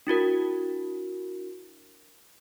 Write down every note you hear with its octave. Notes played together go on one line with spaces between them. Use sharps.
D4 E4 F#4 A#4